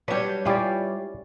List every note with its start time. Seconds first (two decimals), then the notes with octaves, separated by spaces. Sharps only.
0.08 F#3 G3 D4 G4 B4 C#5
0.45 G3 C#4 E4 F4 G4 D5